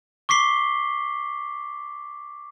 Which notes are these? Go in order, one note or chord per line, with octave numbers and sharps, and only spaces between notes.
C#6 D6 B6 C7 G7